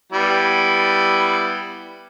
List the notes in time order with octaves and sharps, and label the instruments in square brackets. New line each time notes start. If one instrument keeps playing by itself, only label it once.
[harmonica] G3 B3 E4